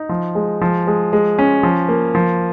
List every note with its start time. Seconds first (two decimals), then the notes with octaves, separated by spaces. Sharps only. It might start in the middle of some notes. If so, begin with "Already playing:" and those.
Already playing: D#4
0.09 F3
0.35 G#3
0.61 F3
0.87 G#3
1.13 G#3
1.39 C#4
1.63 F3
1.89 A#3
2.15 F3